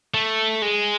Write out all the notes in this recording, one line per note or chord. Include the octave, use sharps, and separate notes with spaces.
A3
G#3